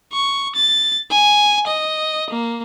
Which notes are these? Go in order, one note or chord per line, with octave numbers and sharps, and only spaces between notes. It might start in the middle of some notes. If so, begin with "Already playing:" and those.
C#6
A6
G#5
D#5
A#3